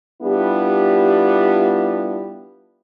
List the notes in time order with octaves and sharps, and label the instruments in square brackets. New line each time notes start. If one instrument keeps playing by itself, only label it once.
[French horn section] G3 B3 D4 E4 F4 G4